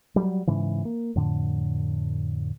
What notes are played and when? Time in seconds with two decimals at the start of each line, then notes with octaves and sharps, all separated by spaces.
0.16 F#3 G3
0.47 G#2 C#3 E3
0.85 A#3
1.15 F2 A2 D3